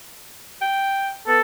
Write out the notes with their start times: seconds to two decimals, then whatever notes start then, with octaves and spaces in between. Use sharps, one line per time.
0.62 G5
1.28 B3 A4